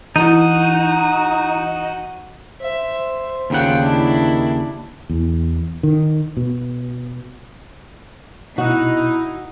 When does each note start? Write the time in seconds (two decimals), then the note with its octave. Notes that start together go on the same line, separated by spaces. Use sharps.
0.16 E3 D#4 E4 F#4
2.62 C5 E5
3.50 D#2 C#3 F4 F#5 G5
3.82 D#3 D4 E4
5.09 E2
5.83 D#3
6.37 B2
8.58 B2 D#4 E4 F#4 F#6